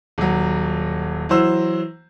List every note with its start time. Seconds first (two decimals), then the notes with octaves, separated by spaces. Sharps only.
0.18 D#1 F#3
1.29 E3 F#3 C5 E6